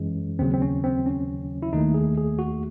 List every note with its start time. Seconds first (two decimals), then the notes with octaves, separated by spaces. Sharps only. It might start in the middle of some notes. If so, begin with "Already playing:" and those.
Already playing: F#2 E3 G#3 C#4
0.39 D#2 C#3 F#3 C4
0.54 C4
0.62 C#4
0.84 C4
1.06 C#4
1.62 E4
1.73 D#2 D#3 A3 D#4
1.94 G#4
2.17 G#4
2.39 F#4